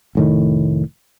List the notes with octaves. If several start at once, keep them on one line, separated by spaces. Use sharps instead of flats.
F1 A2 D#3